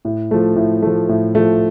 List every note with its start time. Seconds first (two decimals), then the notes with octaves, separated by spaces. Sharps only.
0.05 A2
0.31 F3 A3
0.56 A2
0.82 F3 A3
1.09 A2
1.35 F3 A3